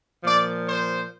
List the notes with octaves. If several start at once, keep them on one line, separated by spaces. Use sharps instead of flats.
A#2 F3 D5
C5